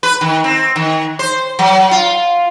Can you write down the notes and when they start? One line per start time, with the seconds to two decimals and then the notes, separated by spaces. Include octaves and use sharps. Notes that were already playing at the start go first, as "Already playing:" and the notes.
0.03 B4
0.21 D#3
0.44 C4
0.76 D#3
1.19 C5
1.59 F#3
1.91 F4